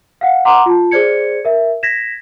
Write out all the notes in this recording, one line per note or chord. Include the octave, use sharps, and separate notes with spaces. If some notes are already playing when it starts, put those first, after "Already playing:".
F5 F#5
F#5 A#5 C6 D6
F4 A5
G#4 C5 D5 G#6 C#7
A#4 E5
G#6 A#6 B6 E7